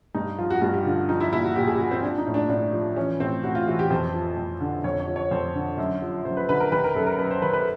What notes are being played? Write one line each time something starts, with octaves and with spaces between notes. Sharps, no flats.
G2 D#4
F3 F4
F#4
G2 F#4
G4
D3 F4
F3 D#4
E4
A#2 E4
F#4
A#2 G4
G#4
F3 F#4
C4
F3 D4
D#4
A2
D4
A2 D4
F3
E3 C#4
A2 C4
A2 F#4
F4
E3 F#4
G4
F2 C5
F3
F2
D3
F2 C#5
C#5
F3
C#5
F2 C5
D3
F#2
F3
F#2 C5
B4
D3 B4
A#4
D#3 B4
A#4
F#2 A4
A#4
F#2 B4
C5
D#3 B4
B4